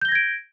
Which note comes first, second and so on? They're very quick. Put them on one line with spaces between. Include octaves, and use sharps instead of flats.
G6 G7 A#6 G#6 D7